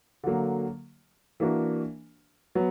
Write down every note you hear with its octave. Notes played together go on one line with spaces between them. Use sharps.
D3 F#3 A#3
E3 A#3 D4 F#4 A#4
F#3 B3